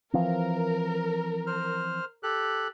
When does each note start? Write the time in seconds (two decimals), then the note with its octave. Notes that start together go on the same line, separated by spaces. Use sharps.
0.13 E3 F3 C4 A#4
1.47 C5 F6
2.23 G4 A4 F#6